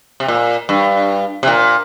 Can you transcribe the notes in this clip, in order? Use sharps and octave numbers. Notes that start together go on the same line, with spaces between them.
C3
A#2
G2
C3
A#2